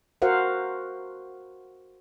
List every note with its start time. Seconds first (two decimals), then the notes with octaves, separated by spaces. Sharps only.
0.22 F#4 A#4 C5 F5 F#5